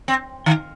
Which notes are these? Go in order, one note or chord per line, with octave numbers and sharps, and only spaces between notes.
C4
D#3